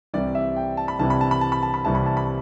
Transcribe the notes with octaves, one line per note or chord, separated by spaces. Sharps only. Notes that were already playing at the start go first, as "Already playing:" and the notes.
C2 C3 E3 G3 D5
E5
G5
A5
B5
C2 C3 E3 G3 A5
B5
A5
B5
A5
B5
A5
B5
C2 C3 E3 G3 A5
B5
A5
B5